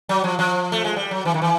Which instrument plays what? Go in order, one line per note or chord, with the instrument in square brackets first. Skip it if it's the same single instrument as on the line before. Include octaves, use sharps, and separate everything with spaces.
[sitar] F#3
F3
F3
A3
G#3
G3
F#3
E3
D#3
E3